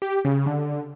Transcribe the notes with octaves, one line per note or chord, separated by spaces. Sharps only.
G4
C#3
D3